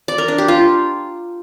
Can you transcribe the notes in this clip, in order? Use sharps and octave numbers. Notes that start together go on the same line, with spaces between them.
D5
A#4
D4
G4
F4